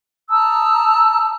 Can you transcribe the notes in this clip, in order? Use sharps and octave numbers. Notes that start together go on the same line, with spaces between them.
A5 A#5 D#6 E6